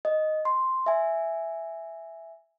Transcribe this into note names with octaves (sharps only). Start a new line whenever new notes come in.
D#5
C6
E5 G#5